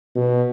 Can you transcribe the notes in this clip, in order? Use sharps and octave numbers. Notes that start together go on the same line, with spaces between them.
B2